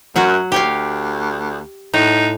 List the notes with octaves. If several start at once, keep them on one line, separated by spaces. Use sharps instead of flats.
F#2 F#3 F#4
D2 G4 C#5 F5
A2 D#4